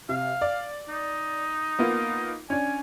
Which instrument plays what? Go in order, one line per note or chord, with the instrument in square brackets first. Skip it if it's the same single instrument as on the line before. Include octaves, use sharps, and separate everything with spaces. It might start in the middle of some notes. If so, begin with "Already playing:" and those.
[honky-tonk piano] C3 [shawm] F5
[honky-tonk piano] D5
[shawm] D#4
[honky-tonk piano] A#3 B3 F4
[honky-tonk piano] C#4 D4 [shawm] G#5